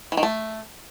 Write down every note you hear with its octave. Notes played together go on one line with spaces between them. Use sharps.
E3
D#3
A3